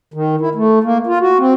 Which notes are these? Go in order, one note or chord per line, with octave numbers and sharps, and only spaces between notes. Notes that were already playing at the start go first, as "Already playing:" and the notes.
D#3
E4
A3
A#3
F4
F#4
C4